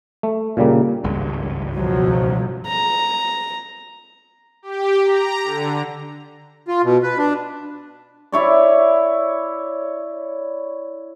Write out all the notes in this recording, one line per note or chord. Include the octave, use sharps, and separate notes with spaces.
A3
A#2 C#3 G3 A#3
G#1 C#2 G2
B1 F3 F#3
A#5
G4
A#5
D3
F4
B2
B4
D4
E4 C#5 D5